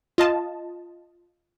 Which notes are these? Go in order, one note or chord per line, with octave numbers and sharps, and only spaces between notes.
F4 D#5 A5